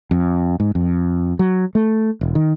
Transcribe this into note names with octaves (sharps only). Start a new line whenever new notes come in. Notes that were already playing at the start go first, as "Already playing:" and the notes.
F2
G#2
F2
F#3
A3
E1
D#3